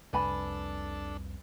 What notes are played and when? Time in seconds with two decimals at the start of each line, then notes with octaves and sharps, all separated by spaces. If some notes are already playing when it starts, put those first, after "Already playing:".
0.13 C2 F2 D4 A4 B4 G#5 B5